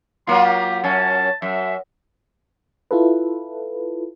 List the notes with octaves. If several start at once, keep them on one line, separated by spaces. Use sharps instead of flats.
F#3 A#3 F4 C6
G4
F#2 C#4 A5
F#2 E5
E4 F4 A4 B4